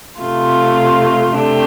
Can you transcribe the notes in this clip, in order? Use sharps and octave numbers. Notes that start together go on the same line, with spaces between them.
C3 A3 F4
C3 A3 D4 G4